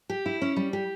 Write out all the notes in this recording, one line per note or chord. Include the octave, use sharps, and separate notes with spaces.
G4
E4
C#4
G3
G4